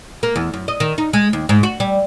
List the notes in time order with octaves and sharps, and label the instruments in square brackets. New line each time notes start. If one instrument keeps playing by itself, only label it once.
[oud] A#3
E2
F#2
D#5
D#3
D#4
G#3
D#2
G#2
F#4
G3